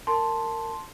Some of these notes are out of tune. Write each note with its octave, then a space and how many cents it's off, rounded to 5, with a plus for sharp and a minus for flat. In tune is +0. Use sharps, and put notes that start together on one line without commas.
A#4 -20 A5 +0 C6 +0